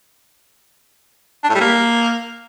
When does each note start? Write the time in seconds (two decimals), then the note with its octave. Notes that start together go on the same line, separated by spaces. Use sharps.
1.44 D4
1.50 A2
1.55 G3
1.61 A#3